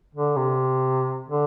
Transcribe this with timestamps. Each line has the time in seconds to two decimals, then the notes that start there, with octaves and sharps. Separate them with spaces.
0.15 D3
0.36 C3
1.28 D3